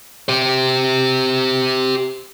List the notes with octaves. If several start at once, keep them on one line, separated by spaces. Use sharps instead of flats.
G4 C5